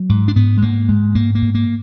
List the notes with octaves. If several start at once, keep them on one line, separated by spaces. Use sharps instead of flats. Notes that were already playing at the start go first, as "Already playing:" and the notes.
Already playing: F#3
G#2
D4
G#2 B3
G#3
G#2 A#3
G#2 G#3
G#2 A#3
A#3
G#2
A#3